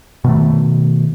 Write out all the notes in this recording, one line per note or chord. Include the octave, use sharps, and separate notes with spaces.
B2 D#3 A3